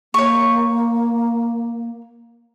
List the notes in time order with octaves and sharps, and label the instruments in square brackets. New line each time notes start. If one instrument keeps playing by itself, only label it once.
[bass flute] A#3 [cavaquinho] C#5 C#6